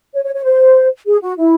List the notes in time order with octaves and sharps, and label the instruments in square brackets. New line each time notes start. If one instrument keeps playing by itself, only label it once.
[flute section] C#5
C#5
C#5
C5
G#4
F#4
E4